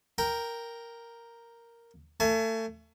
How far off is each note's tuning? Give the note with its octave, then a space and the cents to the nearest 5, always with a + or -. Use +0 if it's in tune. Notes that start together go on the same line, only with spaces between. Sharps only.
A#4 +0 G5 +0
A3 +30 G#5 +40